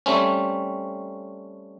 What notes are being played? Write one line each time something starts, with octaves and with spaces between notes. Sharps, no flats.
G3 A3 C4 C#4